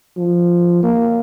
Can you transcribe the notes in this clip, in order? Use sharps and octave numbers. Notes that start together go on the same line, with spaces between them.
F3
A#3